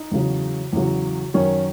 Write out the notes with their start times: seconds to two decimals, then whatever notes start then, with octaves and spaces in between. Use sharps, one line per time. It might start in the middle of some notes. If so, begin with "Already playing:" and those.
Already playing: D#4
0.11 E2 C#3 F#3
0.73 E2 C#3 F#3
1.34 F#2 D#3 F#3 C#4